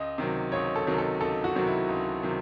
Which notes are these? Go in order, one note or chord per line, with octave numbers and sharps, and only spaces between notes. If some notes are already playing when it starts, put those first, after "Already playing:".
Already playing: C#2 D#5
C3 D#3 F#3
C#2 C#5
A4
C3 D#3 F#3
A4
C#2 A4
F#4
C3 D#3 F#3
E4
C#2
C3 D#3 F#3